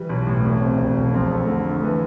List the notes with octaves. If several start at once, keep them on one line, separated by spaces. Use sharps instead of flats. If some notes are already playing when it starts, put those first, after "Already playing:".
Already playing: E3 G3
B1
A2
E1
C3
E1
E1
F2
A3
D3
A3
E3